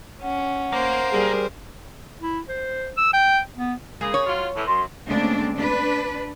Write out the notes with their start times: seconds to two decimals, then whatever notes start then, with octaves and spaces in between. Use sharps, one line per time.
0.23 C#4 F#5
0.73 A#3 C5
1.11 G3 G#4 A#4
2.21 E4
2.48 C5
2.97 E6
3.13 G5
3.57 B3
4.01 C#3 G#3 A#3 G#4
4.14 C#5
4.26 F#3 F4
4.55 A2 E3
4.67 F#2 C6
5.06 D2 C#3 G#3 A#3 C4 D4
5.58 D4 B4